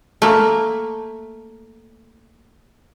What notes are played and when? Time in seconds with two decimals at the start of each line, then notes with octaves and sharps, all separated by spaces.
0.22 A3 A#3